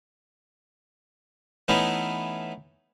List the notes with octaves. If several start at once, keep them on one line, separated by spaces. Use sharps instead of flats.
E3 A3 B3 C#4 D#4 E4